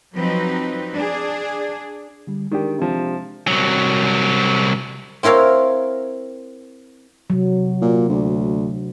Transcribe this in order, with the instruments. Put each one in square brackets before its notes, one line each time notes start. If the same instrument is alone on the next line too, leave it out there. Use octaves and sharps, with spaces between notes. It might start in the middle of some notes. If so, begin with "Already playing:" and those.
[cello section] F3 F#3 C4 D#4 B4
D4 G#4
[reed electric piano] D3 G3
[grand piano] D#3 [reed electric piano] G#3 D4 G4
[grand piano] C3 F3
[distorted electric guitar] C2 F#3
[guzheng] C4 E4 A#4 C#5 F5
[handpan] C3 F#3
[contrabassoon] A#2
D2